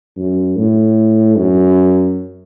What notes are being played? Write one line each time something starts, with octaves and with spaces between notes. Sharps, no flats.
F#2
A2
F#2